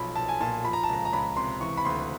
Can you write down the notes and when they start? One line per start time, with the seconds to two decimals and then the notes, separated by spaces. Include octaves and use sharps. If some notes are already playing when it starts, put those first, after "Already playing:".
Already playing: B1 F3 B5
0.16 B1 A5
0.28 G#5
0.40 A#2 A5
0.65 F3 B5
0.73 A#5
0.84 A5
0.89 C#2 A#5
1.05 A#5
1.13 C#2 B5
1.37 C3 C6
1.61 E3 C#6
1.77 B5
1.85 D2 C6